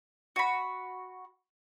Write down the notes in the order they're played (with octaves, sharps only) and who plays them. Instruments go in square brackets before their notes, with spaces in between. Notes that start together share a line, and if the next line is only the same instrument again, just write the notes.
[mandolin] F#4 B5